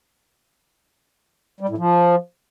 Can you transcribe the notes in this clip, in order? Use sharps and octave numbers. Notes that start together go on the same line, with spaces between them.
G3
A2
F3